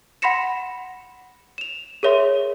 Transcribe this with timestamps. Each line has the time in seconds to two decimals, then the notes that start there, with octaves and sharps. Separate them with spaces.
0.22 F#5 B5 C6 A#6 C#7 E7
1.58 E7 F7
2.03 G#4 A#4 C#5 E5 C6